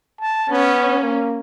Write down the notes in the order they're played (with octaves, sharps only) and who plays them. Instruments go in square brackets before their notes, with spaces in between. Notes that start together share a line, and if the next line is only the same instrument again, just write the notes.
[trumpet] A5
[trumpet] B3 [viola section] C#4
[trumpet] A#3